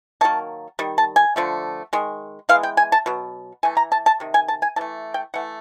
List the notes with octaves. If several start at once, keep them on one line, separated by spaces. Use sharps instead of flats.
D#3 F#3 A#3 A5
D#3 G3
A5
G#5
D3 F3 A3
D#3 G#3
E3 G#3 B3 F5
G5
G#5
A5
B2 F#3
E3 A3 G#5
A#5
A5
A5
C3 D#3
G#5
A5
G#5
E3 A3 A5
G5
E3 A3 F#5